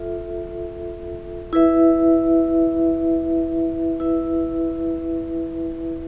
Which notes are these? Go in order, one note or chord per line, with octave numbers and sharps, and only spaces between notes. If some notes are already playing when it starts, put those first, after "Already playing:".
Already playing: F4 A4 E5
E4 B4 E5
E4 B4 E5